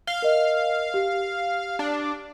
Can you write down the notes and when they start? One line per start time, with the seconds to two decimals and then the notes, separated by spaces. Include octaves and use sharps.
0.07 F5 G7
0.22 A#4 D#5
0.94 G4
1.79 D4